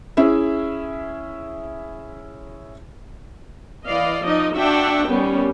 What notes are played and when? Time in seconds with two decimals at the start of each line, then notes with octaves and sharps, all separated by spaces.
0.17 C#4 E4 G#4 E5
3.87 E3 D5 D#5 F5
4.24 F3 D#4 D5 D#5
4.55 D4 F#4 E5 F#5 G5 A5
5.08 D#3 G3 B3 C#4